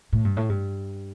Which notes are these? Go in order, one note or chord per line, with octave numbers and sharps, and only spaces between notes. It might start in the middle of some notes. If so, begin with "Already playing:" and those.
A2
G2
A2
G2